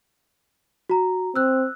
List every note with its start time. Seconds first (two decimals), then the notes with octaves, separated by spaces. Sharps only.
0.90 F#4 A#5
1.36 C4 E6 F#6